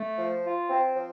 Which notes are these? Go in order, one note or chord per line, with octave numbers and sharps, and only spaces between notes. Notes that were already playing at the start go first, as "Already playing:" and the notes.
Already playing: A3
F3
F4
C4
F3